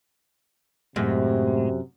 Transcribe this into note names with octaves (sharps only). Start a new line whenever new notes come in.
F#2 A2 C3 G#3